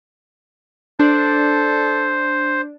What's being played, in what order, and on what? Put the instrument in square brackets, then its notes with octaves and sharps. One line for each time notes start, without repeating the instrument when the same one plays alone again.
[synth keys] D4 [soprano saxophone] A4 [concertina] C5